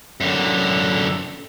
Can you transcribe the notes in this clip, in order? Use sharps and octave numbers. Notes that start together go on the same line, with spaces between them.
F#2 D3